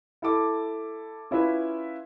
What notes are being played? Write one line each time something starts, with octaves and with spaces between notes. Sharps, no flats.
E4 A4 D6
C#4 E4 F4 B4 E5